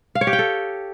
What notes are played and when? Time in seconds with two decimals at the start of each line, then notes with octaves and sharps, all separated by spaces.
0.15 F5
0.21 C#5
0.27 G4
0.33 G5
0.39 A4